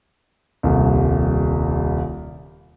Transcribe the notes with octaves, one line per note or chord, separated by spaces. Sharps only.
D#1 C2